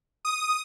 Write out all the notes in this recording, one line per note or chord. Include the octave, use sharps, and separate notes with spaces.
D#6